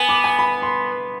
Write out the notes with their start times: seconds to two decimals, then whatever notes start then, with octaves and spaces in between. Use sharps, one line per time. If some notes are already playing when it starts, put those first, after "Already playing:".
Already playing: B3 G#5
0.09 D6
0.24 G#5
0.39 B5
0.62 C6